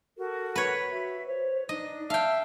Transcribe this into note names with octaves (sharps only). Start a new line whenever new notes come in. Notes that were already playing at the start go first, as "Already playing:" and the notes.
F#4 A4 A#4
B4 C#5
F#4 E5
C5 C#5
D4 D#4 D#5
E5 F5 G5 A5